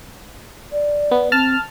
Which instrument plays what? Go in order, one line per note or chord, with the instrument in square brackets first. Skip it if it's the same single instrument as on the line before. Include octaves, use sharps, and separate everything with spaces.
[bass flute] D5
[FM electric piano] B3
[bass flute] C4 [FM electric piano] A5 F6